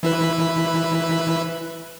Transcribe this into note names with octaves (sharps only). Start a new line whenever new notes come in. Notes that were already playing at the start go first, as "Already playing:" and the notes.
E3 E4 B4